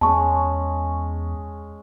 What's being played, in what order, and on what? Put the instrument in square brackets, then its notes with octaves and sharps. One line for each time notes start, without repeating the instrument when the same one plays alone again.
[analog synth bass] E2 [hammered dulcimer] G#3 C#4 [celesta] A5 C#6